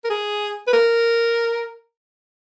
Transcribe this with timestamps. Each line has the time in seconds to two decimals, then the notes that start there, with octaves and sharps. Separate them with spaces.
0.04 A#4
0.10 G#4
0.67 B4
0.73 A#4